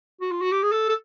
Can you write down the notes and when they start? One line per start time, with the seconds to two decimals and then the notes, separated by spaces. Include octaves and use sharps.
0.21 F#4
0.31 F4
0.41 F#4
0.52 G4
0.62 G#4
0.72 A4
0.89 A4